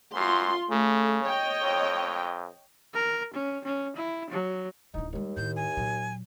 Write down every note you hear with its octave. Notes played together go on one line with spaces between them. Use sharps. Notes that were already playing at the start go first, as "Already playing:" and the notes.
F#2 F4 C6
C#3 A3
C#5 D#5 G5
F2
A#4
C#4
C#4
E4
F#3
D1 D4 D#4
D#2 G3 G#3
A2 D#3 G6
G#5
A#2 F#3